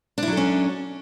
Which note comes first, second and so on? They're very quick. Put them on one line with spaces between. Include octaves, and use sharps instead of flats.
D4 E4 F#3 A4 C#4